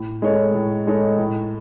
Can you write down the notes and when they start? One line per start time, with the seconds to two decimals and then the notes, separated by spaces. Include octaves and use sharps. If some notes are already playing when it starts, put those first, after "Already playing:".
Already playing: A2
0.22 G#3 D#4 A4 C#5
0.54 A2
0.87 G#3 D#4 A4 C#5
1.18 A2